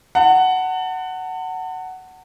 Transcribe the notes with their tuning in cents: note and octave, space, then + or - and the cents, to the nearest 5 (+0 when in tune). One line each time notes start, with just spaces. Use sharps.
F#5 +10 A5 +40